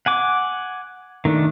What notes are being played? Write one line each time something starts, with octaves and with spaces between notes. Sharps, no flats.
F#5 G#5 D6
D#3 A3 D4